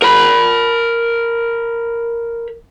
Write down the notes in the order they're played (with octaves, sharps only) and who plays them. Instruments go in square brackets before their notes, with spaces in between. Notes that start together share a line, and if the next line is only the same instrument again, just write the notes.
[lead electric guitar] A#4 B5